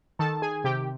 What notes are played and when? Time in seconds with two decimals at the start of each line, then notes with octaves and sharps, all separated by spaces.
0.19 D#3 A4 A5
0.42 G#4 G#5
0.64 C3 G4 G5